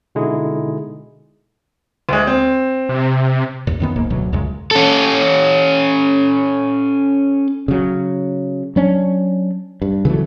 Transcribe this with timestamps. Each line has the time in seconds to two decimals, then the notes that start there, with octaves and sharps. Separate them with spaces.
0.15 B2 D3 G#3 D#4 E4 G#4
2.09 D2 G#3
2.27 C4
2.89 C3
3.67 A1 D#2 A#2
3.80 F#2 D#3 B3
3.96 F1 D2 G#2 A#3
4.10 D1 D2 B2 F#3
4.32 C#2 F#2 C#3 G#3
4.71 C#4 A4
7.68 C#3 F#3
8.76 F#3 C#4 D4
9.82 G2
10.05 C#3 E3 F#3 A3